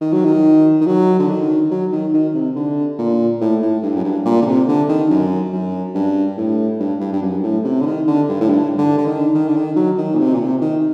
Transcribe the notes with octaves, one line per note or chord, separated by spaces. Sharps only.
D#3
F#3
D#3
D#3
F#3
D3
D#3
F#3
D#3
D#3
C3
D3
A#2
A2
A2
G2
F#2
G2
A#2
D3
C3
D3
D#3
F#2
F#2
G2
A2
G2
G2
G2
F#2
A2
C3
D3
D#3
D3
G2
A2
G2
D3
D3
D#3
D#3
D3
D#3
F#3
D#3
A#2
C3
A#2
C3
D#3